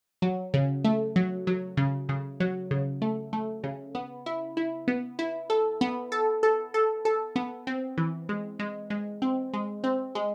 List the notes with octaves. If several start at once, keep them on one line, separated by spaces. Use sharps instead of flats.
F#3
C#3
A3
F#3
F#3
C#3
C#3
F#3
C#3
A3
A3
C#3
B3
E4
E4
B3
E4
A4
B3
A4
A4
A4
A4
B3
C4
E3
G#3
G#3
G#3
C4
G#3
C4
G#3